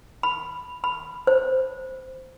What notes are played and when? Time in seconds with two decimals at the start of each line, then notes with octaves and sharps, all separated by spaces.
0.23 B5
0.84 B5
1.27 C5